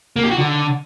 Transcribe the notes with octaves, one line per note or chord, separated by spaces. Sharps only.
A#3
G4
F#4
D3